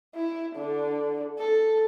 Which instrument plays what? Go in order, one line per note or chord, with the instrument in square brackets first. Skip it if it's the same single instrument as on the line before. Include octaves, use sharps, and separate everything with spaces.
[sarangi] E4
D3
A4